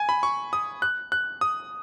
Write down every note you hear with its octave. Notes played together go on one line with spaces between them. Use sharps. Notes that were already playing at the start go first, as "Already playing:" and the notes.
Already playing: G#5
B5
C#6
D#6
F#6
F#6
D#6